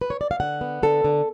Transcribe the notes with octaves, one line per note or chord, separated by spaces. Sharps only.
B4
C#5
D5
F5
D3 F#5
B3
D3 A4
D3